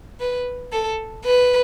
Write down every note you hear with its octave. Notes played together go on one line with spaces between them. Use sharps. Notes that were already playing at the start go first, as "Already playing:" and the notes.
B4
A4
B4